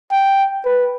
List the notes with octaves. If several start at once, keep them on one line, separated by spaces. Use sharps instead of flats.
G5
B4